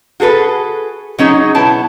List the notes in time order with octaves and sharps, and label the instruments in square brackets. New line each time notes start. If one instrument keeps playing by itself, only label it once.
[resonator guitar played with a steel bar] F#4 G#4 A4 B4
F#3 C#4 D#4 G#4
B2 B3 E4 A5